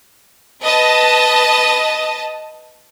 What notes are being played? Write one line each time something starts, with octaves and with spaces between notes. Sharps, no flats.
B4 D#5 A5